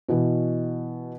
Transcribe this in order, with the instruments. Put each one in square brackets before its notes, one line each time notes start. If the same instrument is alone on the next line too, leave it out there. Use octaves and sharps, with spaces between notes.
[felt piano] B2 E3 F#4